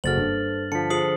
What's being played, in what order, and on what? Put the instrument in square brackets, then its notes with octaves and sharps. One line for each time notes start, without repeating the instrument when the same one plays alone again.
[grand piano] F#1 F#4 [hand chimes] A4 C5 [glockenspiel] F6 A6 F#7
[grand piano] G2
[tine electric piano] D3 F3 [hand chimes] A5 B6 [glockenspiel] C#7
[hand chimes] F4 G#4 C5 [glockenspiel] D#6 C7 F#7